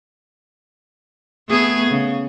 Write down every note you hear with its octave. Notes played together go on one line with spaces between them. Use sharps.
A3 B3 G#4
C#3